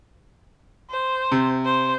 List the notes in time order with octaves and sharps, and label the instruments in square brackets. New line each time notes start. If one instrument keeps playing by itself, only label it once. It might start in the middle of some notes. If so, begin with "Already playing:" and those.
[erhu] C5
[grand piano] C3
[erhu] C5